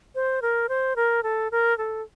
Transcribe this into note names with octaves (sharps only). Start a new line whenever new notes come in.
C5
A#4
C5
A#4
A4
A#4
A4